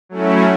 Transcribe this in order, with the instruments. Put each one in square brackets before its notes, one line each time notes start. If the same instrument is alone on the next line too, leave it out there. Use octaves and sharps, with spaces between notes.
[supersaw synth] F#3 A3 C#4 E4